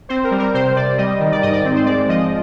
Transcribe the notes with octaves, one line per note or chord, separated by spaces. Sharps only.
C4 C5
A#4
G3
A#4
C3 C5
C3 D5
G3 D#5
D#3
D5
G#2 D#5
D5
C4
C5
G#3 D5
F3 D#5